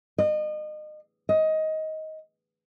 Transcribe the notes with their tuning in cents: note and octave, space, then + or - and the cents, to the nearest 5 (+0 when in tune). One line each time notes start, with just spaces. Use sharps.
D#5 -35
D#5 +15